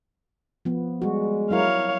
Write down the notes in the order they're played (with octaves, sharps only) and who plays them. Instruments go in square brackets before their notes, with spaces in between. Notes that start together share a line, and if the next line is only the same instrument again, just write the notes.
[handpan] F3 B3
[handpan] G3 F#4 [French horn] G#3
[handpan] F#3 E4 A#4 [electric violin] C#5 F5